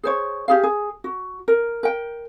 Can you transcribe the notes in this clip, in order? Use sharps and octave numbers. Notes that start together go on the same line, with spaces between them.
G#4 C5 C#5
G4 G#4 F5
G#4
F#4
A#4
A#4 G5